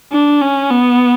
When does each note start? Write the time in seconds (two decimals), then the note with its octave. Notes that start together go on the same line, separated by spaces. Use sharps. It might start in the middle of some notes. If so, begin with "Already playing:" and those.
0.12 D4
0.42 C#4
0.71 B3